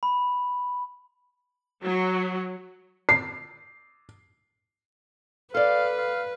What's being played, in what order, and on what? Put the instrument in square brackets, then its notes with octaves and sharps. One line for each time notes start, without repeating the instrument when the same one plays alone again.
[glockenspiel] B5
[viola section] F#3
[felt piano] C7
[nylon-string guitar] A4 D5 [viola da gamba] B4 [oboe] F5
[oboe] F5